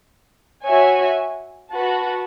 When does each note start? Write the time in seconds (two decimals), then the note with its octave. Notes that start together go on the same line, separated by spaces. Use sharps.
0.65 F#4 C#5 E5 G#5
1.71 F#4 B4 F#5 A5